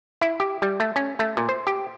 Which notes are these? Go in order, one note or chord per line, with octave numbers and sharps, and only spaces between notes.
E4
G4
G3
A3
C#4
A3
A#2
C5
G4